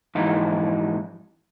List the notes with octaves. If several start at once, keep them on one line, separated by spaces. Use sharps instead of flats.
F2 G#2 E3 D#4